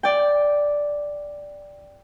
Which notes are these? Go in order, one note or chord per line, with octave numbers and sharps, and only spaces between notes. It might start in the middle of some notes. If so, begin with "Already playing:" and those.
D5 G5